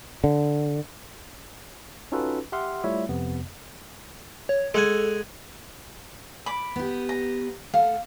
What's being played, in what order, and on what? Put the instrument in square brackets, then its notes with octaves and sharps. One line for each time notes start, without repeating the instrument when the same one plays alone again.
[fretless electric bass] D3
[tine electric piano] C#4 D#4 F4 F#4 A4 B4
G4 E5 F#5 C6 F6
G3 A3 E4 F4 C#5 E5
F2 C3 B3
[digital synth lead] C#5
[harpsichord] G#3 F#5 G#5 [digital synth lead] A4
[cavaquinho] B5 D6
[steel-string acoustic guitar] B3 G4
[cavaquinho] A#5
[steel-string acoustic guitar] A3 A4 F#5 [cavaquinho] F5